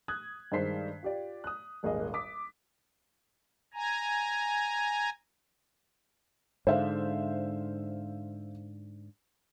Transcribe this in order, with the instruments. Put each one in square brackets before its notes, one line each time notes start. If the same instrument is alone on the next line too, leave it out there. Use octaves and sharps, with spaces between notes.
[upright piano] D#6 F#6 G#6
G2 D#3 G#3 C5 B6 C7
F4 G4 D5
D#6 F#6
D#1 G#1 A#3 G#4 D#5
D6 D#6 B6
[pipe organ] G#5 A#5
[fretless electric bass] G#2 D3 [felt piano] C5 E5 F5